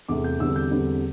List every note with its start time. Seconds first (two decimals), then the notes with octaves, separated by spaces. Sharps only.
0.08 E2 C3 A3 D6
0.24 G6
0.40 E2 D3 G3 C4 E6
0.56 G6
0.71 E2 D3 G3 C4